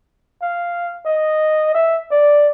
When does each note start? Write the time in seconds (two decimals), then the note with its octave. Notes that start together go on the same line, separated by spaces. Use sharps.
0.42 F5
1.05 D#5
1.75 E5
2.11 D5